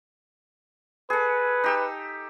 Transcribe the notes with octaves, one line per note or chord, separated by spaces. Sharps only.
G#4 A4 B4
D#4 G4 E6